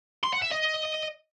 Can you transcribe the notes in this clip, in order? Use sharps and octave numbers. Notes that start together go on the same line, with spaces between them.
C6
F#5
E5
D#5